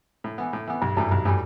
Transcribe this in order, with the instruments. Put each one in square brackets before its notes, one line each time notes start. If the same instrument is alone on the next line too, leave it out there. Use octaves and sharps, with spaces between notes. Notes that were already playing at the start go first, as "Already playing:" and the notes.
[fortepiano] A2
E3 B3
A2
E3 B3
[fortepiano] B1 [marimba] G2
[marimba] F#2 [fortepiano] A2 E3 G3
[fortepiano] B1 [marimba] G2
[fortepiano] A2 E3 G3